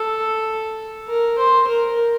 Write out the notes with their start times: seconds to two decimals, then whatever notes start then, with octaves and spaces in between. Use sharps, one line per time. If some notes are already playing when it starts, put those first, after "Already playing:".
Already playing: A4
1.08 A#4
1.38 C5
1.68 A#4